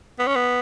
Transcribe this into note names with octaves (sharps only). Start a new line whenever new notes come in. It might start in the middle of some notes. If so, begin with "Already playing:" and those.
B3
C#4
B3